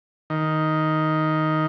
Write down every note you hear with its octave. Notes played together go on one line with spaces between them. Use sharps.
D#3